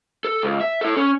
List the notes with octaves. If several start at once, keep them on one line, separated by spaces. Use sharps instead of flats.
A4
C#2
E5
E4 A4
C#4